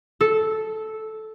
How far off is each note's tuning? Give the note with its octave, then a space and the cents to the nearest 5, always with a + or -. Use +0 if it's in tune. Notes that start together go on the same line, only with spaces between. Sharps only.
A4 -10